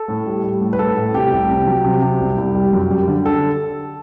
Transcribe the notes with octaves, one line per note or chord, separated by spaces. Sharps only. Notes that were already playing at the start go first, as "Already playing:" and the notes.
Already playing: A4
A2
G3
G3
A2
B4
A2 A4
A2
C3 G4
C2
C3
F#3
C3
C3
C2
C2
G3
F#2
G3
D3
A4